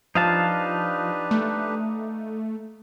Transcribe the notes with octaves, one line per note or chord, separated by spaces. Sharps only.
F3 D4 D#4 G4 B4 F5 A5
A3